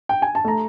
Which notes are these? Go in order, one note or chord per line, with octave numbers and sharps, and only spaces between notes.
G5
G#5
A5
A3 A#5